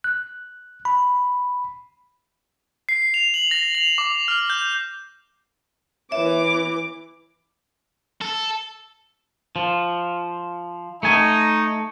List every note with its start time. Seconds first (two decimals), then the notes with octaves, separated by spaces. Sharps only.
0.04 F#6
0.85 B5
2.89 C7
3.14 F7
3.34 F#7
3.51 A#6
3.75 F7
3.98 D6
4.28 F6
4.50 G6
6.11 E3 C#5 E5 D6
8.21 A4
9.56 F3
11.03 A3 D#4 G#5